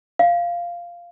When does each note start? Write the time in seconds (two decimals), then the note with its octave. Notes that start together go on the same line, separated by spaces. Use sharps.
0.19 F5